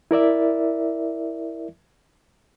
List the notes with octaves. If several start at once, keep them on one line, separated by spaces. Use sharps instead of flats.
E4 A#4 D5 E5